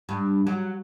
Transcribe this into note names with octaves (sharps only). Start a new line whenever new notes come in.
G2
F#3